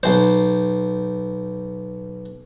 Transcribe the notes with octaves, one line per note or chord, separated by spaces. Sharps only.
B1 C5